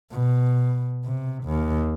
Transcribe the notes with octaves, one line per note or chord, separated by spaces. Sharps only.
B2
C3
D#2